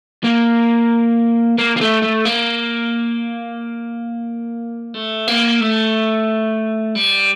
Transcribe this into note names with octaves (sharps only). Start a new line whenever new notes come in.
A#3
A#3
A#3
A3
A3
A#3
A3
A#3
A3
G3